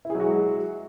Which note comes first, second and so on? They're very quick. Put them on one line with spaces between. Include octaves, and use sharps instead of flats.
E4 G#4 F#3 F#4 G#3